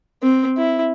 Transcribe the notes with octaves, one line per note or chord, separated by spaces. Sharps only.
C4
E4